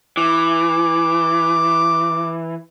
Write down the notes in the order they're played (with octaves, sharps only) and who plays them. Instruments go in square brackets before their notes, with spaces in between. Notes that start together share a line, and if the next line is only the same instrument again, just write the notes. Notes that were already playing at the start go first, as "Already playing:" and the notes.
[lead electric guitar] E3 [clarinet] D6